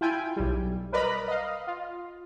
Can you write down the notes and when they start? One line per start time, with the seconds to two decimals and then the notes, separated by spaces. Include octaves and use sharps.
0.01 E4 F4 G5 G#5
0.36 B1 G3
0.92 A#4 B4 D5 D#5 A#5 B5
1.28 D#5 F5
1.67 F4